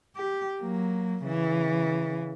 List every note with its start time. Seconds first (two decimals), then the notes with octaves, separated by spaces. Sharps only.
0.16 G4
0.60 F#3 A#3
1.25 C#3 E3